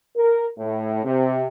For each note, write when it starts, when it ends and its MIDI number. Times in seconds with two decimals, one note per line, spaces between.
0.16 0.44 70
0.58 1.01 45
1.04 1.46 48